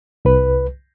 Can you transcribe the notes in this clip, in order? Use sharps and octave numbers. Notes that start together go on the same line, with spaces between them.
C2 B4